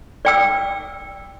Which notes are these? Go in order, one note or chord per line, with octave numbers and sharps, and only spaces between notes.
D5 G5 E6